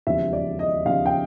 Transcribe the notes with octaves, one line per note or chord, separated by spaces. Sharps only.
E1 D#2 C#3 F3 E5
D5
D#5
E1 D#2 C#3 F3 F5
G5